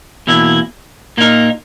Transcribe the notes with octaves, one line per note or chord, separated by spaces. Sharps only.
E2 B2 A#3 E4
A#2 A#3 D#4 A#4